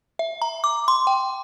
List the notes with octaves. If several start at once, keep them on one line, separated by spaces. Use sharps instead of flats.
E5
A#5
D6
C6
G5